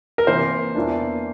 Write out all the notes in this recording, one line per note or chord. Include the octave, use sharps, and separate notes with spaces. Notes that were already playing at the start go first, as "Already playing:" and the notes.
A#4
C3 E3 A#3 C5
E2 E3 A#3 D4